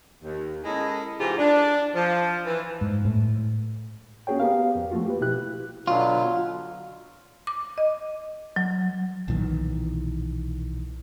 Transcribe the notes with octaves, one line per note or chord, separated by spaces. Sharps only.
D#2
G#3 C#4 E4 A4 A#4 D#5
G#2 C3 E3 A3 F4 G4
D4
F3
E3
G#2
A2
A#3 C#4 F#4 G#4 C#5 G5
B3 G4 A#4 F5
F2
F3 A3 A#3 F4 F#4
G4 B4
B2 E4 G4 F#6
B2 D3 F#3 F4
D6
D#5
F#3
B1 A#2 D#3 E3